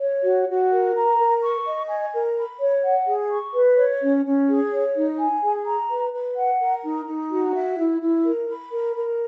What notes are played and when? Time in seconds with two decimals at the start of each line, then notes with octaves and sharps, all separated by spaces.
0.01 C#5
0.24 F#4
0.48 F#4
0.71 A#4
0.95 A#5
1.18 A#4
1.42 C#6
1.66 D#5
1.89 G#5
2.13 A#4
2.36 B5
2.60 C#5
2.83 F#5
3.07 G#4
3.30 C#6
3.54 B4
3.77 C#5
4.01 C#4
4.25 C#4
4.48 G#4
4.71 C#5
4.95 D#4
5.19 G#5
5.42 G#4
5.66 A#5
5.89 B4
6.13 B4
6.36 F#5
6.60 A#4
6.83 D#4
7.07 D#4
7.30 F#4
7.54 E5
7.78 E4
8.01 E4
8.24 A#4
8.48 B5
8.72 A#4
8.95 A#4